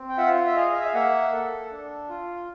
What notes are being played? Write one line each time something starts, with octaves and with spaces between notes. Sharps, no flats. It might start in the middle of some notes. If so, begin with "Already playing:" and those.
Already playing: C4
G5
F4 E5 F#5
E5
G#4 D#5 F5
D#5
E5
F5
A#3 E5 F#5
A4
D4
F4